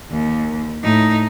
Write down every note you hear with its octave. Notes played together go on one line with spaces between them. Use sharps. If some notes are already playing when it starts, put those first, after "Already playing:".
D#2
A2 D#4